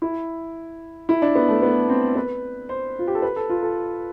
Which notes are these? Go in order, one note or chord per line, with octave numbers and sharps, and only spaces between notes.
E4
E4
D4
B3
A3
B3
C4
B4
C5
F4
G4
A4
B4
A4
F4
A4